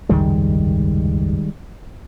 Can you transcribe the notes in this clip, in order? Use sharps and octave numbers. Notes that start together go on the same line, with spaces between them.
F1 C#2 G2 D#3 G3 G#3